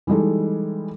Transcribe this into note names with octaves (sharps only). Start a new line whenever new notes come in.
E3 G3 G#3 D#4 A4